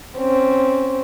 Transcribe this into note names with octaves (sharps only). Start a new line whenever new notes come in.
C4 C#4